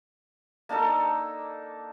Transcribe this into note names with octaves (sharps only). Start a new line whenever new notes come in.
A#3 D4 D#4 A4